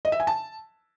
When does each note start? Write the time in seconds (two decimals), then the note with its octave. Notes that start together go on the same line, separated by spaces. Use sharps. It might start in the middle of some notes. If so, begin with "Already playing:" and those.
0.05 D#5
0.12 E5
0.20 G#5
0.27 A5